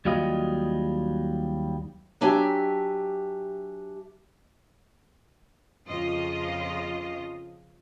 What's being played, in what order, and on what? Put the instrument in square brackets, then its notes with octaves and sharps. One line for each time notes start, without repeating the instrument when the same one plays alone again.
[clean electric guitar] D#2 F#3 G3 F4 D#5
[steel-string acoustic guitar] F#3 D4 G4 E5 G#5
[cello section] F2 C#3 F3 F4 D#5